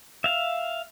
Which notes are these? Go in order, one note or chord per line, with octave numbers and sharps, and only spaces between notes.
E5 F5